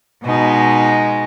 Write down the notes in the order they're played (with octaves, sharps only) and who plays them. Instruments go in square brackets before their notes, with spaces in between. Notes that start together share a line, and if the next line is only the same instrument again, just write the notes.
[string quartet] B2 G#3 D#4